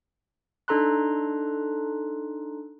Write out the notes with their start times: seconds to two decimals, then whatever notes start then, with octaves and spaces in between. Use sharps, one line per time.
0.68 D4 D#4 A4 A#5 C6 F#6